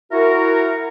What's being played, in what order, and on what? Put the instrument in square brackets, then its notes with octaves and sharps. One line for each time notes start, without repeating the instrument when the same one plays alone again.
[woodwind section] E4 F#4 A#4